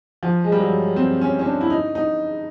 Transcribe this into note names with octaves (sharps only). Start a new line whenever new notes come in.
F3
G#3
G3
F#3
C4
C#4
C#4
D4
E4
D#4
D#4